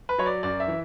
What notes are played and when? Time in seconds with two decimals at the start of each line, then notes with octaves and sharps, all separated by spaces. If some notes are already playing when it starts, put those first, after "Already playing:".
0.09 B4
0.18 F#3 C#5
0.26 D5
0.43 F#2 D5
0.60 E5
0.68 E3